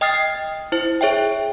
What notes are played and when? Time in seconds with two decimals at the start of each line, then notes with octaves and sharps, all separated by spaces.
0.01 D#5 G5 D#6 F6 A6 C7
0.72 E4 C5
1.01 G#4 C#5 E5 G5